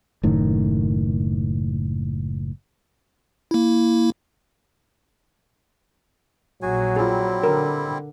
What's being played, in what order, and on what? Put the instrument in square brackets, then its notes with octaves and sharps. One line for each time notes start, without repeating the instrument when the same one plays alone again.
[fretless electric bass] F#1 A2 D#3
[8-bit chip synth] A#3 E4
[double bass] A#1 [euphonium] F#3 [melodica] F#4 G#4 G#5
[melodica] G3 C4 E4 [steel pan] F4 G#4
[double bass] D3 [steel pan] A#4